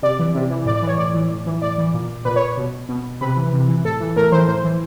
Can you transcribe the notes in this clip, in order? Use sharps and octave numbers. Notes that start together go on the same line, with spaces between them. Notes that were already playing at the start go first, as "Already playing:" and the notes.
C3 D5
E3
C3
E3
A2 D5
D5
E3
C#5
A2 D5
E3
A2
E3
A2 D5
E3
A#2
A#2 B4
C#5
B2
B2
C3 B4
E3
C3
E3
A2 A4
E3
A2 A#4
E3 C5
A2 C5
E3